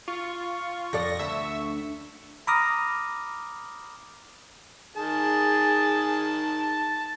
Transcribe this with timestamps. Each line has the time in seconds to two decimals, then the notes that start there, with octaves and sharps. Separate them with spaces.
0.08 F4 C#6
0.93 F2 A4 D5 A#6
1.19 D2 E5
2.47 A#5 B5 D6 D#6 F6 A#6
4.96 D#3 G#4 A5